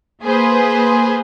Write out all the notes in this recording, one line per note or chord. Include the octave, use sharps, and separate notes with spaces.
A#3 G#4 B4 C5